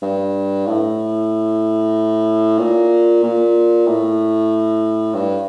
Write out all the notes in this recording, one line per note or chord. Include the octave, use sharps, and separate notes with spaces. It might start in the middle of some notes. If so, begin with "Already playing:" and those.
G2
A2
A#2
A#2
A2
G2